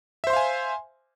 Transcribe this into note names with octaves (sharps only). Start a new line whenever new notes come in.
C5 E5 F5 G#5 C6